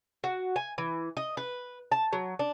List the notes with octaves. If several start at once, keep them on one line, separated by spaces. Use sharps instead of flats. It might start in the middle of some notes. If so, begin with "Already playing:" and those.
F#4
G#5
E3
D#5
B4
A5
F#3
D4